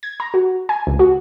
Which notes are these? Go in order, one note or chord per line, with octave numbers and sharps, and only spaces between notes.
G#6
A#5
F#4
G#5
C#2
F#4